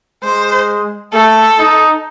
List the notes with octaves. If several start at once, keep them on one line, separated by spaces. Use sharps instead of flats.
G#3 C5
A3 A4
D#4